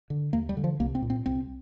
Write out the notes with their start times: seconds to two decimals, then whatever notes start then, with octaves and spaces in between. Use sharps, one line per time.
0.10 D3
0.33 D#2 A#3
0.49 G3
0.57 D3
0.64 F3
0.80 C2 A#3
0.95 C4
1.02 A#2
1.10 C4
1.26 C2 C4